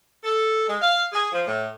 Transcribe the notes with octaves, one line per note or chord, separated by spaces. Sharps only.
A4
G#3
F5
G#4
F3
A2